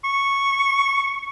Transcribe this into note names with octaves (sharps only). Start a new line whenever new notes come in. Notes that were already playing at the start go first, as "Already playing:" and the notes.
C#6